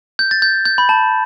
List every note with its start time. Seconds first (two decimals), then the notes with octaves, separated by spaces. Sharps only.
0.19 G6
0.31 A6
0.42 G6
0.65 G6
0.78 B5
0.89 A5